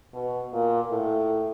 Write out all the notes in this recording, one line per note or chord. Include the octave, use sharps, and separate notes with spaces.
B2
A#2
A2